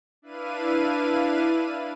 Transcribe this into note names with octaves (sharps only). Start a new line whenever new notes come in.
D4 E4 B4 F5 D#7